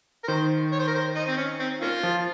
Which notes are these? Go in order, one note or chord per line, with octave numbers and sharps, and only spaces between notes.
A#4
D#3 C5
C#5
C5
A#4
C5
D#4
C4
C#4
C4
A#3 C#4 F4
F3